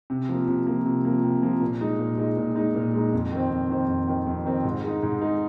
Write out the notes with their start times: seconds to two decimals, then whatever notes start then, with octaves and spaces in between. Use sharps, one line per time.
0.10 C3
0.29 F3 A#3
0.48 C3
0.67 F3 A#3
0.85 C3
1.05 F3 A#3
1.24 C3
1.43 F3 A#3
1.61 A#2
1.81 G#3 D#4
1.99 A#2
2.18 G#3 D#4
2.37 A#2
2.56 G#3 D#4
2.75 A#2
2.93 G#3 D#4
3.13 F2
3.32 D#3 C4
3.50 F2
3.70 D#3 C4
3.88 F2
4.08 D#3 C4
4.27 F2
4.46 D#3 C4
4.64 G#2
4.84 G#3 D#4
5.03 G#2
5.21 G#3 D#4